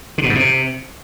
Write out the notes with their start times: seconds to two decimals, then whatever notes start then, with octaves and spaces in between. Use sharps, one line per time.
0.18 D3
0.24 B2
0.29 G#2
0.35 C3